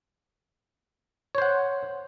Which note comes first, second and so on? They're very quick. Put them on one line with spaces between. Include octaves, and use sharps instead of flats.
C#5 C5 F#5